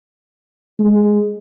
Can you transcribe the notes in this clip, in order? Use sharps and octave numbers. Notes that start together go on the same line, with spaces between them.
G#3